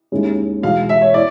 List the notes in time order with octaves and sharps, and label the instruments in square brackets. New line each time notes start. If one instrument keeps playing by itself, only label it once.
[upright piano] D#2 D#3 G#3 C#4 E4
[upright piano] E2 B2 G#3 [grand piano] F5
[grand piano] E5
C#5
[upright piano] E4 [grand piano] D5